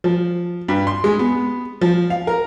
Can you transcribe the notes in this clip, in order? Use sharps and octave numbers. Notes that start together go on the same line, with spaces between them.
F3
G2
C6
G#3
B3
F3
F5
A#4